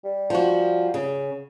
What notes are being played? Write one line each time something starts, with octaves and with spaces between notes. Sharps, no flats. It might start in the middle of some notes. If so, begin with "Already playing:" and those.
G3
F3 F#4
C#3